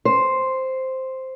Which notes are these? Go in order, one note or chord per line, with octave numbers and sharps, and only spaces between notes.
C5